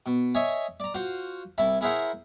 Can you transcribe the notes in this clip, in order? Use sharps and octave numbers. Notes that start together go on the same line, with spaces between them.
B2
C#5 D#5 E5 G#5 D#6
D5 A#5
F4 F#4 C5
C2 E4 E5 A5
E4 G#4 A#4 C5 E5 F#5